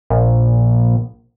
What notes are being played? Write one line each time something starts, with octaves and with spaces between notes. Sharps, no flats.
A#1